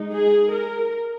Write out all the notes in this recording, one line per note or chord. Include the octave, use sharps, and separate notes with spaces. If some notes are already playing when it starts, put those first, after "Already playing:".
Already playing: G#3 D#4
G#4
A#4